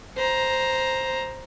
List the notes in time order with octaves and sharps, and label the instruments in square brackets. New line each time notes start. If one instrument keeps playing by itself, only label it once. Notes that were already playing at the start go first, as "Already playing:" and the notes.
[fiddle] C5 A#5